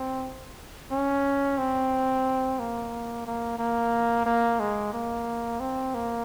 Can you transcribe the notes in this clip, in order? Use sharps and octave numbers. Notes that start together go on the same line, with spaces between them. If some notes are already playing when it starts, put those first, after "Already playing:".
Already playing: C4
C#4
C4
A#3
A#3
A#3
A#3
G#3
A#3
C4
A#3